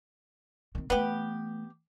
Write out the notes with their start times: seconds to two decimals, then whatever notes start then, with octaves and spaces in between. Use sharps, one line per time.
0.75 D#3 C4
0.90 E3 A3 B3 G4